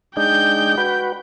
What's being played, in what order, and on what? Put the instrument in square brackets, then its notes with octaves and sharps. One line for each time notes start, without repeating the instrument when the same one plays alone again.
[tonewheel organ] G#3 D4 D#4 [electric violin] G5 G6
[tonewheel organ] F#4 B4